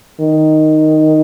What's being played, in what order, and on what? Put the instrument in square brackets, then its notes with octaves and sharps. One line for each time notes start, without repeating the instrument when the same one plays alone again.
[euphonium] D#3